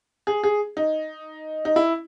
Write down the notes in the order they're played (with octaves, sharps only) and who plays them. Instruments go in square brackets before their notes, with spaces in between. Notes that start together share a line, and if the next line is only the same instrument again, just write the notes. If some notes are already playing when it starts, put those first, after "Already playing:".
[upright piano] G#4
G#4
D#4
D#4
E4